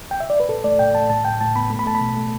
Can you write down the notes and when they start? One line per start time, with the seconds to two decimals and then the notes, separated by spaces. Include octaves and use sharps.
0.11 G5
0.20 E5
0.30 D5
0.40 B4
0.48 A2 A4
0.64 A3 D5
0.79 A2 G5
0.94 A3 A5
1.10 A2 A5
1.25 A2 G5
1.41 A2 A5
1.56 B3 B5
1.70 A3
1.79 B5
1.86 A3 A5
1.95 B5
2.01 B2
2.16 A3